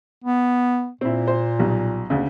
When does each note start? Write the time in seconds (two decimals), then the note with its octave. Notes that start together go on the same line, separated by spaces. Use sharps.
0.24 B3
1.01 A#2 C4 E4
1.28 C5
1.59 B1 G3
2.10 D2 C#3